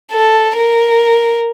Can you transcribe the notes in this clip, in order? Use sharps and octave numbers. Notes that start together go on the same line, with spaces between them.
A4
A#4